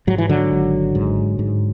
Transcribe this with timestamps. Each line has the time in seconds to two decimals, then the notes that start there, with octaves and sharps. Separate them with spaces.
0.07 G#2 F#3
0.18 E3
0.29 D3 F#3
0.51 G#1
0.95 G#2
1.39 G#2